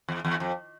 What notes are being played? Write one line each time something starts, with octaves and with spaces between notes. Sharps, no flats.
E2
E2
F2